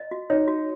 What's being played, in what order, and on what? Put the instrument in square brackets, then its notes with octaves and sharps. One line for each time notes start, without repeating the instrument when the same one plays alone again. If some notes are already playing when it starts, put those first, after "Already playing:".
Already playing: [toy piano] D#5
F#4
[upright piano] D#4 [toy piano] C#5
[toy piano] F#4